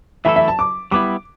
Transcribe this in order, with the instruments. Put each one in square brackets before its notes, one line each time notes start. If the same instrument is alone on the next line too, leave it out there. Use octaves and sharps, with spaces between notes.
[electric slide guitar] E3 A3 E4 A4 [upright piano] E5
[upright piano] E5
A5
D6
[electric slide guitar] G3 B3 E4 [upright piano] D6